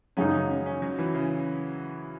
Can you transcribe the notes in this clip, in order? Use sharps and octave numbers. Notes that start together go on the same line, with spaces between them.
F#2 C#3 G#3 C#4 D#4
C#4
C#4
C#4
F#3
E3
C#3